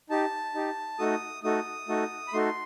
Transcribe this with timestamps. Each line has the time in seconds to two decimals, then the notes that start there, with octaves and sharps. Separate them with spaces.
0.10 D#4 G4 A5
0.54 D#4 G4
0.99 A3 D#4 F#4 A4 D#6
1.43 A3 D#4 F#4 A4 D#6
1.88 A3 D#4 F#4 A4
2.28 B5
2.33 A3 D#4 F#4 A4 C6